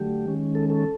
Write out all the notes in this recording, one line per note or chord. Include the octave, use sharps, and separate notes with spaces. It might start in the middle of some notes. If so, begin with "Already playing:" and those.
Already playing: D3 F#3 A3 G4
D#3 G#3 C#4
A4
A4